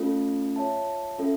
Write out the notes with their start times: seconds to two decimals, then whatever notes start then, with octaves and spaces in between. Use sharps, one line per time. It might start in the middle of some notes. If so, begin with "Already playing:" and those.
Already playing: A3 C#4 F4 A4
0.56 F4 C#5 E5 A5
1.18 C#4 F4 A4 E5